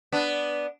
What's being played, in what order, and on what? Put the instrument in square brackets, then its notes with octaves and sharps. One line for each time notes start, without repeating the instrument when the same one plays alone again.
[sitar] B3 D4